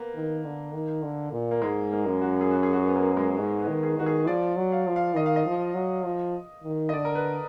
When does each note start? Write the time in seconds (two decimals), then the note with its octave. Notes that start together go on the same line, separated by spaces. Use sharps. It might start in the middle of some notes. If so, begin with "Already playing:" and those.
Already playing: A#3 B3
0.15 D#3
0.45 D3
0.73 D#3
1.03 D3
1.33 A#2
1.51 A#3
1.62 G#2 G#3
1.92 A#3
2.06 F#2
2.21 F#4
2.41 G#4
2.51 F#4
2.63 G#4
2.73 F#4
2.87 B3
2.95 A#3
3.17 G#3
3.39 G#2
3.62 B3
3.69 D#3
3.83 G#4
3.98 D#3 F#4
4.06 G#4
4.27 F3 D5
4.57 F#3
4.72 F5
4.87 F3
4.96 F5
5.16 D#3 D#5
5.26 F5
5.36 D#5
5.47 F3
5.75 F#3
6.05 F3
6.64 D#3
6.89 D#5
6.93 D3 D5
7.05 A#4
7.15 B4